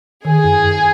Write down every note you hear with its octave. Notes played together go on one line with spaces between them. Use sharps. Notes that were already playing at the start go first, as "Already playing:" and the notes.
D#3 G#4
F#2
F#2